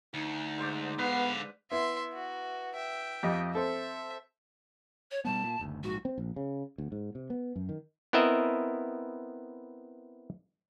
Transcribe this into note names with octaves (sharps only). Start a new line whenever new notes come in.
D2 D#4
G#2 C5 D5
D3 B3 B4 F5
B3 E4 E5 C6
F#4
E5 G5
F2 G4 D#5
C4 A4 E5
C#5
B2 G3 B3 A5
A#2
F#1 D2
A#1 G#2 F#4
C4
A#1
C#3
D2
G#2
C3
B3
F#2
D#3
B3 C4 E4 A#4 D#5 E5